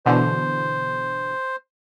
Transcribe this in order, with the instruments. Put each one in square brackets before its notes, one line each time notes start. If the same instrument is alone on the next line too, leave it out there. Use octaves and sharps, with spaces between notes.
[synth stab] B2 D3 E3 [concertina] C5